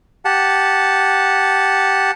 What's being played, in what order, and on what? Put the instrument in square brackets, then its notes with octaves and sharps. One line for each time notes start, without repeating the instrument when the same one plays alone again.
[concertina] G4 F#5 A5